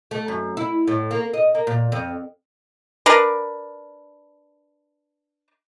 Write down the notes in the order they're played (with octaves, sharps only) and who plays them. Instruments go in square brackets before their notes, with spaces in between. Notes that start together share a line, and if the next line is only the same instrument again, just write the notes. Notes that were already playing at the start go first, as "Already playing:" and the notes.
[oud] A3
F#2
E4
A2
A#3
D#5
A#3
A#2
F2
[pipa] D4 A#4 B4